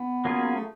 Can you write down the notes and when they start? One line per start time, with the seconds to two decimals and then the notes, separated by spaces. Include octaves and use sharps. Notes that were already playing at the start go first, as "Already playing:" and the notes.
Already playing: B3
0.25 F#3 A#3 C#4 F4 G#4
0.56 A3